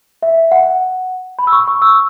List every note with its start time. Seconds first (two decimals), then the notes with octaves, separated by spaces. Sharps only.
0.23 E5
0.52 F#5
1.39 B5
1.47 E6
1.52 C#6
1.68 C#6
1.82 E6